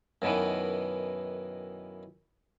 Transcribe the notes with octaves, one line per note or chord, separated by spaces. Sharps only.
F#2 B2 D#3 E3